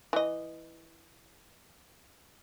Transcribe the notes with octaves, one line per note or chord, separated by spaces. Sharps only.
E3 D#5